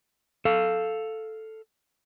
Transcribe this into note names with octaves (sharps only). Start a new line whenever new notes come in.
A4 F5